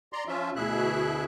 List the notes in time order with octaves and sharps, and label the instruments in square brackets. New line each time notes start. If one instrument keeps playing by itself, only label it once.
[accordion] D5 A#5 C6
F3 C#4 F4 E5
D2 B2 E4 G#4 E5 F#6